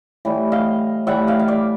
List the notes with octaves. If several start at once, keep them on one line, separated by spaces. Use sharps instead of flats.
A2 E3 G3
D#5 F5
A2 E3 G3 E5 F#5
D#5 F5
F5
D5 E5